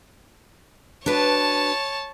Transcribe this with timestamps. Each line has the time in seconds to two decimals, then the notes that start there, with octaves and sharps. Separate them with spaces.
1.06 D4 F#4 B4 C#5 A5